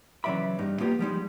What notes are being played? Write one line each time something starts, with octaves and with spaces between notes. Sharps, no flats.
C#3 E3 F#3 D5 E5 B5
G2 D#4
G#3 A#3 B3 F4 G4
F3 G3 G#3 D#4